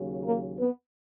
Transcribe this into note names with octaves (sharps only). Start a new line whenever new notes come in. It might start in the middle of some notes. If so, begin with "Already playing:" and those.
Already playing: D#2 C#3 F#3
A#3 A#4
B3 B4